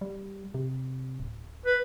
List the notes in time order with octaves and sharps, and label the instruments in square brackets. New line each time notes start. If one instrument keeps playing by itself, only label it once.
[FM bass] G3
C3
D1
[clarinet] B4